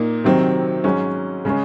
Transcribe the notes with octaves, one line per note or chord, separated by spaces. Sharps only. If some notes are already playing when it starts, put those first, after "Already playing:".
Already playing: A#2 A#3 D#4
C3 D#3 F#3 C4
G#2 F#3 C#4
C#3 G#3 C#4